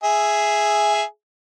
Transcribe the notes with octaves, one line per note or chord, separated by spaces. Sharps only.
G#4 E5